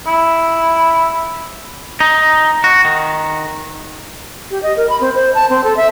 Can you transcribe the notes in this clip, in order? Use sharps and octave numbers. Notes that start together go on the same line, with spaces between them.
E4
D#4
F#4
D#3
G4
D#5
A#4
B5
C4
C5
A5
C4
A4
E5